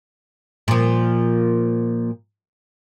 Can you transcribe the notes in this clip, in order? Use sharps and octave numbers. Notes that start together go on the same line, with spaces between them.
A#2 F3